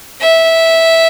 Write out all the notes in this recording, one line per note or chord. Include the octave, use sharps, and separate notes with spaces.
E5